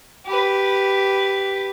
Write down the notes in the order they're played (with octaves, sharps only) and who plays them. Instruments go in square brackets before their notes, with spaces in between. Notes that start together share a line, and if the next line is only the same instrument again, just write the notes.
[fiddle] G4 B4